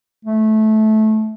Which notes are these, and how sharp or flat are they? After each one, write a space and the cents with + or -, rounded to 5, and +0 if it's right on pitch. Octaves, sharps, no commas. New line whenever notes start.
A3 -20